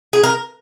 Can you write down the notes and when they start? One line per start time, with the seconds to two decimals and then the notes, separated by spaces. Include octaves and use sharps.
0.13 G#4
0.24 A#4